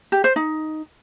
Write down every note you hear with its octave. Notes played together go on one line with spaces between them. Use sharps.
G4
C5
D#4